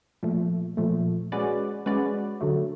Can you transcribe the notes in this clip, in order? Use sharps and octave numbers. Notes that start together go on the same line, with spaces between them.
A#2 F3 A3
A#2 F3 A3
G#3 C#4 F#4 B4 D5
G#3 C#4 F#4 B4 D5
D3 F#3 A3